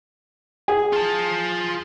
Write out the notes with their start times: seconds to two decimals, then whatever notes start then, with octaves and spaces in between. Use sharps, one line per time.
0.68 G#4
0.93 F4 A5